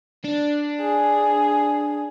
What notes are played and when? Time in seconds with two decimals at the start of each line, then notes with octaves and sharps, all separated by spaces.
0.24 D4
0.81 G#4